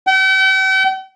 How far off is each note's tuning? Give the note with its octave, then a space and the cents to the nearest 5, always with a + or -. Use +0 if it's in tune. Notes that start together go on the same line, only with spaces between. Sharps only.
G5 -45